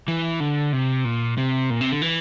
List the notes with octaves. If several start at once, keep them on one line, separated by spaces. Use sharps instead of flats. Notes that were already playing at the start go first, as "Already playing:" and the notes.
E3
D3
C3
A#2
C3
A#2
C3
D3
E3